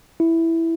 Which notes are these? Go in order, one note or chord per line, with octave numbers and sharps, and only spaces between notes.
E4